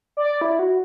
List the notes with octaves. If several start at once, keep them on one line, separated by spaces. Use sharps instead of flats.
D5
E4
F#4